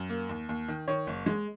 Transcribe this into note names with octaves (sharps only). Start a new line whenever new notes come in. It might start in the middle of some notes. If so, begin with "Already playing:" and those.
Already playing: F#2
A#3
D#2
D#2
D#3
D#3 C#5
F#1
G#3